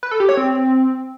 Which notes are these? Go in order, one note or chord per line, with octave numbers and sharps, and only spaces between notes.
B4
A4
G4
C#5
C4